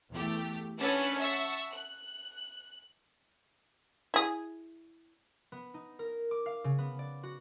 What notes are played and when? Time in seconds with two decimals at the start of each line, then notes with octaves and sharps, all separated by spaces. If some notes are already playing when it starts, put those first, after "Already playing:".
0.11 E2 A3 G4
0.78 C#4 D4 A4 B4 F#5 A5
1.18 E5 F#5 A5 C#6 E6
1.72 F#6
4.14 E4 G#4
5.52 B3
5.74 D#4
5.99 A#4
6.31 D6
6.46 F5
6.64 C#3
6.79 B3
6.99 D5
7.23 F#4